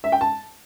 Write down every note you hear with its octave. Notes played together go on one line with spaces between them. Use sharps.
E5
G5
A5